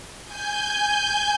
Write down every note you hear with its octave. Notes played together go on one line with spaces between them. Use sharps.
G#5 G6